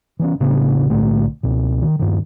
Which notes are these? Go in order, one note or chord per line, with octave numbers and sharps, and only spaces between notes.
E3 B3 C#4
A1 C#3 B3 D4
B1 A2 D3 A3
C#2 B2
D#3
D#1 G2 D#3